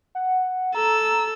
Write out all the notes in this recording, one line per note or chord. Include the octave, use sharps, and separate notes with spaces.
F#5
A4 A#5 E6